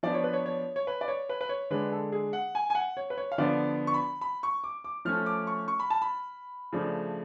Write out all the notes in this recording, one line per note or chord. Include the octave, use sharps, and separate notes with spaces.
F3 B3 D4 D5
C#5
B4
C#5
C#5
C#5
B4
D5
C#5
B4
B4
C#5
D3 G#3 D4 B4
A4
G#4
F#5
G#5
G#5
F#5
C#5
B4
C#5
F5
D3 F3 B3 D4 D5
C#6
B5
B5
C#6
D6
D6
F3 A3 C#4 F6
D6
C#6
C#6
B5
A5
B5
C#3 F3 A3 D4